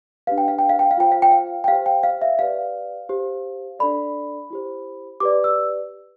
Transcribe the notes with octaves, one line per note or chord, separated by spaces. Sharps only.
D4 G4 B4 F5
G5
F5
G5
F5
G5
F5
F4 C5 G5
F5
G5
F5
G5
G4 C5 F5
G5
F5
E5
G4 B4 D5 F5
G4 C5
D4 A4 D5 B5
E4 G4 C5
G4 B4 D5 D6
E6